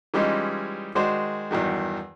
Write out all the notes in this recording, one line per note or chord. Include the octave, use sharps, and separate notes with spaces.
E3 G3 G#3 C#4 D#4 F4
D#3 G#3 F#4 C5 D5
E2 G2 D#3 F#3